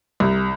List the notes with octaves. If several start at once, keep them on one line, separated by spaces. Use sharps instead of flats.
C2